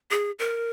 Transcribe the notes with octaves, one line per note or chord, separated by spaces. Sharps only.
G#4
A#4